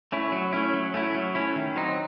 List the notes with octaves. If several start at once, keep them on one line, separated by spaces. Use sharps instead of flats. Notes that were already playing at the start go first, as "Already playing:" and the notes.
A3 C#4 E4
F#3
A3 C#4 E4
F#3
A3 C#4 E4
F#3
A3 C#4 E4
D#3
F#3 C4 D#4